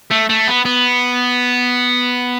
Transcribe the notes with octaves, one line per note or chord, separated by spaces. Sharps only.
A3
A3
B3
B3